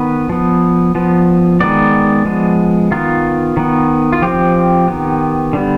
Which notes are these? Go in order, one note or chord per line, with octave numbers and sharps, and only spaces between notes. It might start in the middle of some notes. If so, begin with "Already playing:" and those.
Already playing: D#3 B3 B4
F3 B3
F3 B3
D#3 G#3 B3 D5
F3 G#3 B3
D#3 B3 F4
D#3 B3
F4
F3 C4 G4
D#3 B3
D3 G3 B3